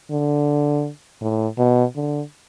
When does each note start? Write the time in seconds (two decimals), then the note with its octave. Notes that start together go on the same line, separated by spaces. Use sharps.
0.11 D3
1.21 A2
1.58 B2
1.96 D3